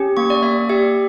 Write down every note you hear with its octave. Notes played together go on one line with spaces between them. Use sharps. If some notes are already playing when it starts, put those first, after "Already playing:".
Already playing: C#4 G4
A#3 C#6
D5
A#3 E5
G4 E5